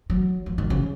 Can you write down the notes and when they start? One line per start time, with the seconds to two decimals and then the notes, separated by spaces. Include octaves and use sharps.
0.10 F#3
0.46 F3
0.58 D#3
0.70 C#3